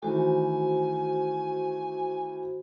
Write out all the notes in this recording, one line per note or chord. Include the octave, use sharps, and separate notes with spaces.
D#3 E3 A3 F#4 C5 G#5